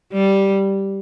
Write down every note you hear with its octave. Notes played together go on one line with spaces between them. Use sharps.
G3